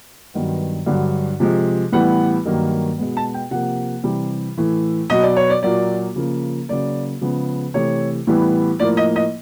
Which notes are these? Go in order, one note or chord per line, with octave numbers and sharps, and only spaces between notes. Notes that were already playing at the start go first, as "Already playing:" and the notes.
G2 D#3 F#3 B3
G2 D3 F#3
C3 F3 G#3
A2 E3 G3 B3 F#5
G2 D#3 F#3 A#3
B2 G#3 B3
A5
G5
C3 F3 A#3 F#5
C3 E3 G3
A2 E3 A3
B2 F#3 B3 D#5
D5
C#5
D5
A#2 F#3 A#3 D5
C#3 F3 A#3
C#3 F#3 A#3 D5
C#3 F3 G#3 B3
C3 E3 A3 C#5
A2 E3 G3 B3
A2 F3 A#3 D5
D#5
D#5